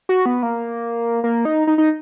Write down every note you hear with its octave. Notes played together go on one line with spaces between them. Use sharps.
F#4
B3
A#3
A#3
D#4
D#4
D#4